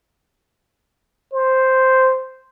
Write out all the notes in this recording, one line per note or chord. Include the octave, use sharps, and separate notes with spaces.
C5